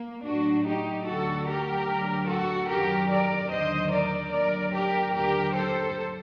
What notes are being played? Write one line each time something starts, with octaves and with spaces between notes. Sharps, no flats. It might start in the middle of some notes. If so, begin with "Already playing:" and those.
Already playing: A#3
A2 F#3 D4 F#4
D#4 G4
D2 D3 F#3 F#4 A4
G4 A#4
D2 D3 F#3
F#4 A4
F#2 D#3 F#3 G4 A#4
A#4 D5
D#2 D3 F#3 C5 D#5
A#4 D5
D#2 D3 F#3 A#4 D5
G4 A#4
D#2 D3 F#3 G4 A#4
A4 C5